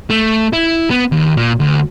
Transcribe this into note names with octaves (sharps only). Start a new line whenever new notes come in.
A3
E4
B3
D#2
A#2
D2